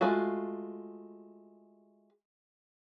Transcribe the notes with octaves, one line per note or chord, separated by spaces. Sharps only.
G#3 A3 F4 F#4